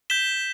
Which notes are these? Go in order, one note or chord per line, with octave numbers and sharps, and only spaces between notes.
G6 B6 E7 G7